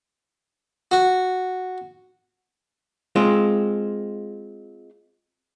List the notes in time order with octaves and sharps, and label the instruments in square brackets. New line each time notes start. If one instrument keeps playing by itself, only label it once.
[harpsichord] F#4
[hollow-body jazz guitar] G#3 C4 F4